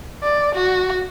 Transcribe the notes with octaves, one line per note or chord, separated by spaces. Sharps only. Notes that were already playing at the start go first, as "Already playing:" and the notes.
D5
F#4